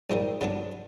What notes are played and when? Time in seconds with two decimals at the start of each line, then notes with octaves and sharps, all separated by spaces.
0.10 A#1 G#2 D#3 G3 A#3
0.41 G2 D3 F#3 B3 D4